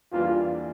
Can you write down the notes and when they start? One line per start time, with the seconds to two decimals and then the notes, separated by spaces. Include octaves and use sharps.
0.12 E2 E3 G3 A#3 D4 F4